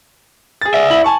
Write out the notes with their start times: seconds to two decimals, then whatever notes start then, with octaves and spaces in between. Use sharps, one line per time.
0.61 G#4 A6
0.74 D5 E5
0.90 E4 F#7
1.04 G#5 A5 C#6